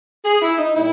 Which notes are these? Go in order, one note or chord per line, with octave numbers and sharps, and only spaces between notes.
G#4
E4
D#4
A#2 G3 E4